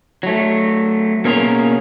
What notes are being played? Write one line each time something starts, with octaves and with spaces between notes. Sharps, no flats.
F#3 A3
B2 A#3 C#4 G#4 B4 A#5